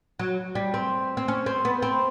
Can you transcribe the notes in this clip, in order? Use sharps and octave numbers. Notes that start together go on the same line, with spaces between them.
F#3
G3
C4
C4
C#4
C4
B3
C4